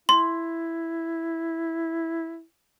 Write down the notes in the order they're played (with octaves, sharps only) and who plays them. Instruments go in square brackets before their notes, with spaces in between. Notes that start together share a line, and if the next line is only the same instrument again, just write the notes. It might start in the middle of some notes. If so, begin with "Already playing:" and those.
[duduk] E4 [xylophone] C6